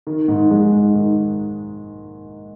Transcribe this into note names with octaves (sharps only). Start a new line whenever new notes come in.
D#3
G#2
G#3
G#2
D#3